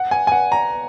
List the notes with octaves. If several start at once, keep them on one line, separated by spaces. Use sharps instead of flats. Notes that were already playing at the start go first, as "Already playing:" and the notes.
Already playing: F#5
G#5
G#5
F#5
A#5